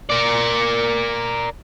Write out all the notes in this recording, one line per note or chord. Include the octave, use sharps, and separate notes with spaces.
A#4 D5